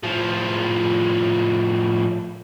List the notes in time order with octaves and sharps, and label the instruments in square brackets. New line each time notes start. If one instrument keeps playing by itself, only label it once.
[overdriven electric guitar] A2 F3